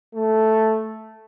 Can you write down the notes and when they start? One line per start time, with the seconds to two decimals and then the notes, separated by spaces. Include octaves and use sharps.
0.14 A3